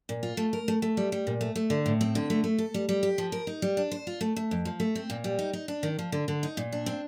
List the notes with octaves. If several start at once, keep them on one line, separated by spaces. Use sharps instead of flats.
A#2
F4
A3
A#4
A3
A3
G3
G3
A#2
A3
A3
D3
A2
C4
D3
A3
A3
A4
G3
G3
G4
F3
A#4
D#4
G3
D4
C5
F4
A3
A3
F2
F3
A3
C4
A#2
G3
D#4
D#4
D4
D#3
F3
D3
D3
D#4
A#2
D4
C4